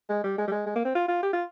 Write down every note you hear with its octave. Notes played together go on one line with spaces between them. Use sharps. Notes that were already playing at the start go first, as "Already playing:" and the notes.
G#3
G3
G#3
G3
G#3
G#3
A#3
C4
F4
F4
G4
F4